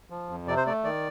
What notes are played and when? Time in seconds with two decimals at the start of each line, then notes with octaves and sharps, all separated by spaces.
0.10 F3
0.29 F2
0.47 C3 D5
0.57 C5
0.66 A3 D5
0.84 D#3 D5